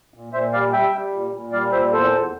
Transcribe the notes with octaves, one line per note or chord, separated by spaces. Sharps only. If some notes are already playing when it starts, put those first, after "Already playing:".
A#2
A#2 C5 E5
G3 D5 F5
G3 E5 G5
G3
A#2
A#2
G3 D5 F5
A#2 C5 E5
E2 A4 C5
E2